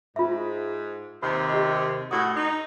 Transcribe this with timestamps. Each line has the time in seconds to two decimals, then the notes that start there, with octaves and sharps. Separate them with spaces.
0.16 G#2 F4 E5
1.23 D#2 C3
1.50 G4 D#5
2.11 A2 F#4 D#6
2.36 D#4